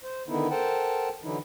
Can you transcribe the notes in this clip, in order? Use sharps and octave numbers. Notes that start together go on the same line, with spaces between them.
C5
D3 D#3 B3 D#4 E4
A4 A#4 C5 F#5 G5 A5
D3 E3 F#3 D#4 E4